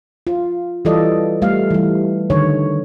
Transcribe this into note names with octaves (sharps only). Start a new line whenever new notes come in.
F4
E3 G3 F4 A4 D5 D#5
G3 A3 F5
E3 G3
D3 D#3 C#5